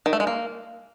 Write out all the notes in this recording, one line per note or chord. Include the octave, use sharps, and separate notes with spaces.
D#3
A3
G#3
A#3